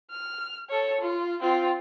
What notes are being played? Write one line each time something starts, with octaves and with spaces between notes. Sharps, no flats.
F6
A4 C#5
F4
C4 F4